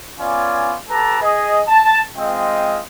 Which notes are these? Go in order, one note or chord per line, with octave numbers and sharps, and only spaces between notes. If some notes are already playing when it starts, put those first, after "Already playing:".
B3 C#4 F4 D5 G#5
G4 A4 B4 A5 A#5
G#4 D#5
A5
G#3 C4 F4 D#5 G5